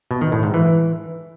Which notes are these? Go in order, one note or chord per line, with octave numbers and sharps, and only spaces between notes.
B2
D#3
A2
G#2
E3